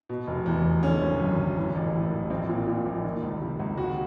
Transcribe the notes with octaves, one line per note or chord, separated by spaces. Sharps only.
B2
F1
E2
F1
D3 C#4
G#1
F#2
G#1
E3
A1
A2
A1
A#1 C4
A#2
A#2
A#1
D#3
C#2
C3
C#2
D#2 F#4